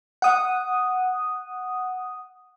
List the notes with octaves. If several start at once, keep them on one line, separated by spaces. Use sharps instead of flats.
F#5 D#6